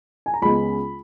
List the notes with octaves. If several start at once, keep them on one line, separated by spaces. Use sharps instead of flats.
G#5
A#5
C#2 C#3 G#3 B3 B5